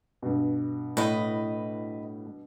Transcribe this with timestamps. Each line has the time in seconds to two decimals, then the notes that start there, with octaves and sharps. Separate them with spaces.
0.22 G2 B2
0.97 A2 B4 D#5